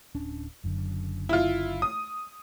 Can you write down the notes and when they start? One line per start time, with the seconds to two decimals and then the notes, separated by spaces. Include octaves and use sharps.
0.15 D1 C#4 D4
0.64 F#1 F#2 D3
1.29 E4 F4
1.82 D#6